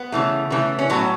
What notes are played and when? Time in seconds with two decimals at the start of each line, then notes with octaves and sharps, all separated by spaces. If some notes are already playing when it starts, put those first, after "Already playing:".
Already playing: B3
0.12 C#3 E3 A3
0.50 C#3 E3 A3
0.79 C#4
0.90 A2 F#3 A3 B3